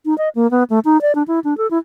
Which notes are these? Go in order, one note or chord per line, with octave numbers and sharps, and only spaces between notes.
D#4
D#5
A#3
B3
A3
D#4
D5
D4
E4
D4
A4
E4